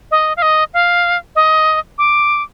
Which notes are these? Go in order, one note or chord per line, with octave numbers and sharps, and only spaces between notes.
D#5
F5
D#5
F5
D#5
D6